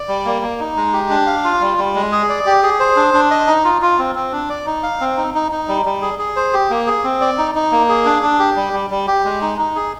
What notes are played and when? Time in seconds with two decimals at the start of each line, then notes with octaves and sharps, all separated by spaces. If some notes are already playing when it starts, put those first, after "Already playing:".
Already playing: D5
0.08 G3
0.25 A#3
0.42 A#3
0.60 D#4
0.76 G#3
0.93 G4
1.10 D4
1.27 F5
1.44 F4
1.61 G3
1.78 G3
1.95 G#3
2.12 G#4
2.29 D5
2.46 G4
2.63 G#4
2.80 C5
2.96 D4
3.14 D4
3.31 D#5
3.47 D#4
3.65 F4
3.82 F4
3.99 C4
4.15 C4
4.32 D4
4.49 D5
4.66 D#4
4.83 F5
5.01 C4
5.17 D#4
5.34 D#4
5.52 D#4
5.68 G3
5.86 G3
6.02 G#4
6.19 G#4
6.36 C5
6.53 G4
6.70 A#3
6.87 G#4
7.04 C4
7.21 D5
7.38 D#4
7.55 D#4
7.72 A#3
7.89 G#4
8.05 D4
8.23 D4
8.39 G4
8.56 G3
8.73 G3
8.90 G3
9.07 G4
9.25 G#3
9.42 D#4
9.58 D#4
9.76 G#4